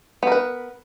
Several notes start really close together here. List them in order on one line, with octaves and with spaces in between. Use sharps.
B3 A#4 B4